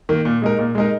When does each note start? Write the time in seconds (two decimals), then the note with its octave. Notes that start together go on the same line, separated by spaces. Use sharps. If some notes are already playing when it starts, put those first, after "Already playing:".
0.09 D#3 A#3
0.25 A#2
0.42 G#3 D#4 A#4
0.59 A#2
0.75 G#3 D#4 A#4